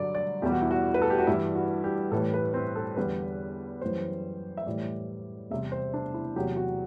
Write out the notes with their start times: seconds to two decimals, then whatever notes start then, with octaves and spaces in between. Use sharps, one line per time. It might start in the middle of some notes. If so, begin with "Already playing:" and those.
Already playing: G2 D3 F#3 D5
0.15 D5
0.42 E2 B2 G3 G4
0.52 F#4
0.62 E4
0.71 F#4
0.94 B4
1.02 A4
1.10 G4
1.18 F#4
1.27 G2 E3 G3 E4
1.55 F#4
1.84 G4
2.11 A2 E3 G3 A4
2.34 B4
2.54 C4
2.76 A4
2.97 E2 D3 G3 B4
3.81 F#2 E3 G3 C5
4.57 E5
4.66 A2 E3 G3 D5
5.50 E2 C3 G3 E5
5.72 C5
5.94 D4
6.14 E4
6.36 E2 C3 F#3 G4
6.56 F#4